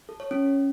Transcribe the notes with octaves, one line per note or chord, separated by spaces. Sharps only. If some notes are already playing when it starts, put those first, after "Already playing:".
A4
C#5
C#4